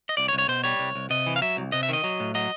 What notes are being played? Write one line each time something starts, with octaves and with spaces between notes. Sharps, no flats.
D#5
C2 D5
C#5
C2
C#5
B2 C5
G3 C#5
C2
C2
C3 D#5
E3
F5
F#3 E5
C2
C3 D#5
E5
D#3 D#5
F#3
A2
F#3 D#5